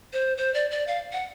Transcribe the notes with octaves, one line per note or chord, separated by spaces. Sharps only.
C5
C5
D5
D5
F5
F#5